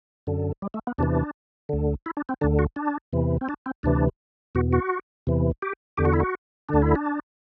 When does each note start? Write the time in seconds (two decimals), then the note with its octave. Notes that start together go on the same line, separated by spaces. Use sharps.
0.27 F#2 D3
0.62 G3
0.74 A3
0.87 B3
0.98 E2 C3 E3 D4
1.69 D2 D3
2.06 E4
2.17 D4
2.29 C4
2.41 D2 D3 D4
2.59 F#4
2.76 D4
3.13 E2 C3 E3
3.41 C4
3.49 D4
3.66 C4
3.83 D2 C3 E3 D4
4.55 E2 B2 F#4
4.73 F#4
5.27 E2 C3 E3
5.62 G4
5.97 E2 D3 G4
6.05 F#4
6.13 E4
6.20 F#4
6.69 D2 D3 D4
6.82 E4
6.95 D4